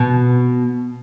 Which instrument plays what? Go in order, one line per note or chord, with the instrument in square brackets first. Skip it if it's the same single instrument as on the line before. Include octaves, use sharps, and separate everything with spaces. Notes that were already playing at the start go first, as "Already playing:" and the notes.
Already playing: [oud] B2